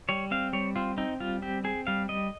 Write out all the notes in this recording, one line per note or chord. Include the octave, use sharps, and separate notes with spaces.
G3 C#5
C4 F5
G3 C#5
C4 F4
C4 D#4
G3 F4
C4 G4
C4 G#4
G3 F5
G3 D#5